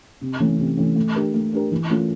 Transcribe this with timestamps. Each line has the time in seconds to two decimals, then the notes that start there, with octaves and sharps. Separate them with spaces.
0.21 C3
0.40 E3 A3 C#4
0.58 C3
0.77 E3 A3 C#4
0.96 A3
1.15 D4 G4 A#4
1.34 A3
1.53 D4 G4 A#4
1.71 E3
1.90 A3 C#4 F4